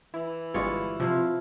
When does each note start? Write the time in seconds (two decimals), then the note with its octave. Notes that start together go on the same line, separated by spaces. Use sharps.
0.14 E3 E4
0.54 G1 G3 G#3 F4 C#5
1.00 C3 F3 E4 F4 F5